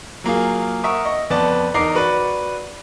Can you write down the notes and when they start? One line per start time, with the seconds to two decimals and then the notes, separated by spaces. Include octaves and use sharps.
0.24 F#3 A#3 F4 G#4
0.84 A#4 E5 F#5 C#6 D#6
1.05 D#5 C#6
1.30 F2 B3 D5 A5
1.74 E2 D#4 A#4 D6 C7
1.95 F#4 B4 D5 C#6